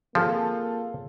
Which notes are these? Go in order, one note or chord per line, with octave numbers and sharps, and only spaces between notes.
F3 A#3 C4 F4 G#4 A4